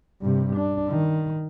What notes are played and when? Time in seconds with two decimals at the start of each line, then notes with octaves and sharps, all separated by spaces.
0.21 G2 C3
0.56 D4
0.88 D#3